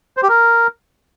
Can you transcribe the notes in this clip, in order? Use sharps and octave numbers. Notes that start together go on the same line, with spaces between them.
C5
G4
A#4